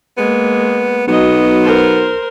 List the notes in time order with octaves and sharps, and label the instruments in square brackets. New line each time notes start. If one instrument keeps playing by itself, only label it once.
[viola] G#3 A#3 [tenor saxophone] B3
[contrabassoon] B1 [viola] F#3 D#5 [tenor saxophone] B3
[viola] A#4 C5